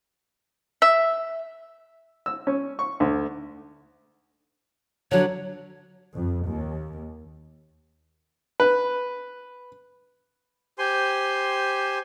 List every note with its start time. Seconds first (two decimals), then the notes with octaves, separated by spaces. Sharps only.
0.82 E5
2.26 E6
2.47 C#4
2.79 C#6
3.00 D2
5.11 D3 F#3 C#5
6.13 F2
6.45 D#2
8.60 B4
10.78 G4 C5 G#5 C6